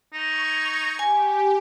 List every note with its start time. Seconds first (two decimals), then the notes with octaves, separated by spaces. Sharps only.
0.13 D#4 C#6 G#6
0.99 G4 G#5